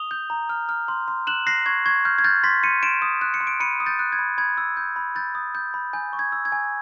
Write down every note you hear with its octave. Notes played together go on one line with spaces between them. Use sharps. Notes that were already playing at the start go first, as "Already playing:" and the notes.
Already playing: D#6 F7 G7
G6
A#5
F6
F6
C6
C6
F#6 E7 F#7
F#6 A#6 C7
C#6 G#6
C#6 G#6
F6 G6
G#6
F6 G6 A6
C6 A6 B6
C6 C#7 D#7
C6 D7 E7
D#6
F#6
C#7
C6
D7
B5 C#7 D#7
D#6
G6 A6
F#6
G#6
B5
B5 G#6
E6
G6
B5
B5 G6 A6
D#6
G6
B5
G#5 G6
C#6
G#6
E6
G#6
G#5